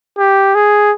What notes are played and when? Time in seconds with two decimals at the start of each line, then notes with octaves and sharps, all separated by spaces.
0.18 G4
0.55 G#4